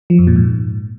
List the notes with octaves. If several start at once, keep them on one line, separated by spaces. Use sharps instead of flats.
F3
F2
A#2
G#2